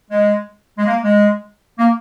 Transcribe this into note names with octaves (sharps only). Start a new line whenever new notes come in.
G#3
G#3
A#3
G#3
A#3